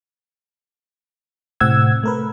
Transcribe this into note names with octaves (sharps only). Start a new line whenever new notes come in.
A2 C3 C4 F#5 E6 G#6
A3 A#4 B4